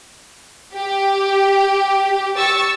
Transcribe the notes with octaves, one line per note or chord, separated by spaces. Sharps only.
G4
C#6 E6 A6